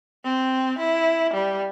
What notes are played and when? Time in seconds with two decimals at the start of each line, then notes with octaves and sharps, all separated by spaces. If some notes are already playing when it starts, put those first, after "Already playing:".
0.25 C4
0.79 E4
1.34 G3